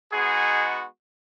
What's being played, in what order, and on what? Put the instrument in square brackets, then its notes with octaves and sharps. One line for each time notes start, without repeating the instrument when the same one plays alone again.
[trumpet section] G#3 B3 D#4 F#4 G#4